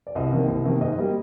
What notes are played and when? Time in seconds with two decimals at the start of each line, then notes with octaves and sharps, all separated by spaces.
0.07 D5
0.15 C2 D#5
0.32 C3 D#3 A#3
0.48 C2
0.64 C3 D#3 A#3
0.81 G#2 D#5
0.98 G3 A#3